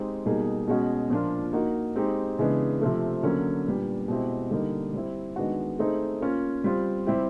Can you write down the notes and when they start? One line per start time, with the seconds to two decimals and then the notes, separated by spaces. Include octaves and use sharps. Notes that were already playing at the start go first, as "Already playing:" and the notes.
Already playing: G#3 C4 D#4 G4
0.26 B2 G3 A#3 D#4 G#4
0.68 B2 G#3 C#4 F#4
1.10 A#2 F3 A#3 D4 F4
1.53 A#3 D#4 F#4
1.96 G#3 C4 D#4 G4
2.38 C#3 E3 G#3 B3 D4
2.81 C3 F3 A3
3.23 D3 F#3 A#3 C#4
3.66 A#2 G3 B3 D4
4.08 B2 G#3 C4 E4 G4
4.51 D3 G3 A#3 D#4
4.93 G3 C4 E4
5.36 D#3 G#3 B3 D4 F#4
5.79 A3 C4 D#4 G#4 C5
6.21 A#3 C#4 F4
6.64 G3 C4 F4
7.07 G3 C4 E4 G4